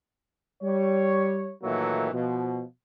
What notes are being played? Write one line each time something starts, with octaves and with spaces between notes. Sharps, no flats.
G3 C#5
A#2 D#3 E3 F#3 A3 A#3
B2 F3